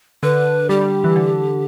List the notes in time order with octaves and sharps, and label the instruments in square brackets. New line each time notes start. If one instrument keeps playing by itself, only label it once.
[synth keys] D3 [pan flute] B4
[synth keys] G3 [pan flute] G4
[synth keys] G3
G3
E3
D3